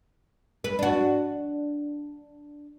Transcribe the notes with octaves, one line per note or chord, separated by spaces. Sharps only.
B4
D4 F#4